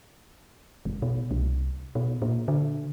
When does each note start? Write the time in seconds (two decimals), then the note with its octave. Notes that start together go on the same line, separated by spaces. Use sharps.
0.85 F#1
1.02 B2
1.31 C2
1.95 B2
2.22 A#2
2.48 D3